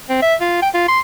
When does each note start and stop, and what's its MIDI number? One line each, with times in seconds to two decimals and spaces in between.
0.09 0.20 60
0.22 0.35 76
0.41 0.60 65
0.62 0.69 79
0.74 0.85 65
0.88 1.00 84